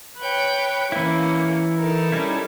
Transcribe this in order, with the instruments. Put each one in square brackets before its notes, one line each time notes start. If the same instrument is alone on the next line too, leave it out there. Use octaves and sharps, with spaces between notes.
[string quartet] B4 C#5 G5
[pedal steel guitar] E3 E4 [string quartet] A#3 C#4
[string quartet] D#4 A4 A#4
[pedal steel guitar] G3 C#4 E4